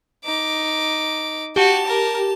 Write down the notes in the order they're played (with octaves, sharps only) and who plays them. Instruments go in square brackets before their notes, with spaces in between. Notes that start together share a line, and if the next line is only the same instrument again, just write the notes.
[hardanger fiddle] D#4 D6
[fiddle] F#4 [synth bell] G4 [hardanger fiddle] A5
[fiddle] A#4